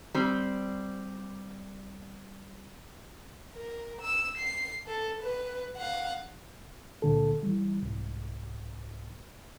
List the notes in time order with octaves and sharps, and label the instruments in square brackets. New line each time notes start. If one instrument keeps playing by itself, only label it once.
[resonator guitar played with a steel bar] G3 C4
[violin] A#4
E6
C7
A4
B4
F5 F#5
[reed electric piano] C#2 A#2 D3 A4
E3 G3
C2 G#2